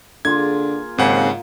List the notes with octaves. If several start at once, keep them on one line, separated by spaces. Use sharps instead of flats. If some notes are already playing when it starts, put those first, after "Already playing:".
D3 A#3 F4 G#4 G#6
D#2 G#2 C#3 C4 F#5